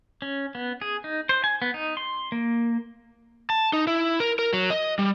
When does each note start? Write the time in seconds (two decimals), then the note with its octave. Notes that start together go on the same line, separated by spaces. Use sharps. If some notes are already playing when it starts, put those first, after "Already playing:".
0.22 C#4
0.55 B3
0.82 G#4
1.04 D#4
1.29 C5
1.44 G#5
1.62 B3
1.74 D#4
1.97 C6
2.32 A#3
3.50 A5
3.73 D#4
3.87 E4
4.20 A#4
4.39 A#4
4.53 F#3
4.70 D#5
4.99 G3